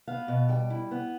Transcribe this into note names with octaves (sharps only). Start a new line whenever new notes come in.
B3 F5
B2
G3 G5
E4
B3